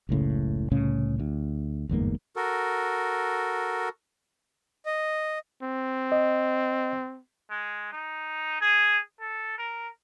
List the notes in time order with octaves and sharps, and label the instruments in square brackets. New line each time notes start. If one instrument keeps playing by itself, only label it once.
[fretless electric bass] F#1 C#2 A2 C#3
C2 A2 C#3 C#4
D2
G1 E2 G#2 A#3
[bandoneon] F#4 A4 A#4
[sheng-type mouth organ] D#5
[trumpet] C4
[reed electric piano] D#5
[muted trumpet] G#3
D#4
G#4
A4
A#4